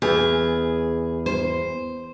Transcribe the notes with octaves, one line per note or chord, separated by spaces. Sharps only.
E2 G#4
C5